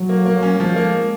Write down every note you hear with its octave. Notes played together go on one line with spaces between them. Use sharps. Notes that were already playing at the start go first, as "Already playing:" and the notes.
Already playing: F#3
A#3
A#3
C#4
F3 G#3
A#3